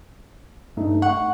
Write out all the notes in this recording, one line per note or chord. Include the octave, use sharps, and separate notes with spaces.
G2 A3 D#4
F#5 C#6